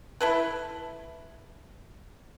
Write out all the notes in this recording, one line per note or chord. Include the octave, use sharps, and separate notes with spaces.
E4 A4 B4